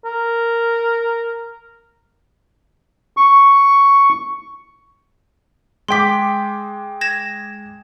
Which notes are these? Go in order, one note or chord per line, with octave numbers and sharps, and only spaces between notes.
A#4
C#6
G#3 G5 C6 D6 B6
G#6 A#6 E7